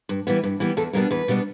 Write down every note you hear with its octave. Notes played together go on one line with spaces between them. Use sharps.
G2
E3 G3 B3
G2
E3 G3 B3
E2 A4
B2 G3 B3 D4 A#4
E2 B4
B2 G3 B3 D4